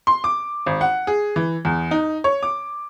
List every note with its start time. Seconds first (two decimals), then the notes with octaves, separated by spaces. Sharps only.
0.07 C6
0.24 D6
0.66 G#1
0.81 F#5
1.07 G#4
1.36 E3
1.65 E2
1.91 D#4
2.24 C#5
2.43 D6